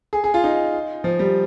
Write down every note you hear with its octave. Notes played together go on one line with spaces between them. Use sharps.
G#4
G#4
F4
D#4
F3
G3